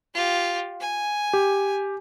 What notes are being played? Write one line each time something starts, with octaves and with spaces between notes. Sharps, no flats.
F4 G4
G#5
G4